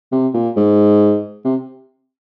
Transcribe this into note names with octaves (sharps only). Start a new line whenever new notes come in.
C3
A#2
G#2
C3